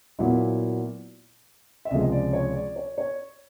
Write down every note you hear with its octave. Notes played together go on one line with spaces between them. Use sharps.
A#2 F#3 B3 E4
E5
C#2 C3 F3 G#3 D#5
D#5
D5
C#5
D5
C#5
C#5